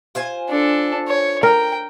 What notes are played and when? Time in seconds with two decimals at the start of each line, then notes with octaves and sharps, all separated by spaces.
0.15 F4 C5 G#5
0.49 D4 A4
1.08 C#5
1.43 A#4 G5